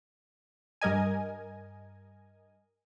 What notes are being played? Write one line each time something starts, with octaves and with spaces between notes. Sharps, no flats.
G2 G3 A#4 D#5 G#5